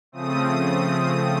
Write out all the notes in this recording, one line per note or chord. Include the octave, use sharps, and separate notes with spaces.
C#3 F3 A3 C4 D#6